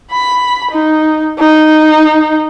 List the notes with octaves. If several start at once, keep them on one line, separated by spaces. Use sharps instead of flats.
B5
D#4
D#4